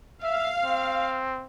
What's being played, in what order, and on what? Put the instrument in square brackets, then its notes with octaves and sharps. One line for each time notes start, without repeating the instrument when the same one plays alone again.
[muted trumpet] E5 [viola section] F5
[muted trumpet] C4